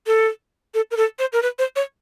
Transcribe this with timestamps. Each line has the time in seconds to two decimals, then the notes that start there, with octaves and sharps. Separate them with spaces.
0.07 A4
0.74 A4
0.91 A#4
0.97 A4
1.19 C5
1.33 A#4
1.42 B4
1.59 C5
1.76 C#5